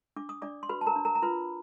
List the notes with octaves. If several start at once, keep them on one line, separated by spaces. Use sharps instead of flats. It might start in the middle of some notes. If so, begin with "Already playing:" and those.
D4 D6
D#6
D4 D5 D6
C6
F#4 B4 B5
A5
A#4 A#5
D4
A#4 A#5
A#5
F4 B4 B5